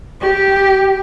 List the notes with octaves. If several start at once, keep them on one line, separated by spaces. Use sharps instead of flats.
G4